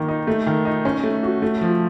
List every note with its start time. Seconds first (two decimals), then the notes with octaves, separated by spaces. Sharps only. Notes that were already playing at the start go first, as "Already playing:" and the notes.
Already playing: D#3 A#3
0.08 D#4
0.27 A3
0.47 D#3
0.65 D#4
0.85 C#4
1.04 A3
1.23 F#4
1.42 A3
1.61 F3